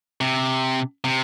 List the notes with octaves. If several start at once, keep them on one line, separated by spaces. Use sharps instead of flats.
C3
C3